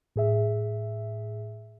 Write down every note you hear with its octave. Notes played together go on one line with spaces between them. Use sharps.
A2 G#4 E5